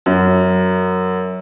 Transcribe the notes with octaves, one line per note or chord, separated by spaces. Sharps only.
F#2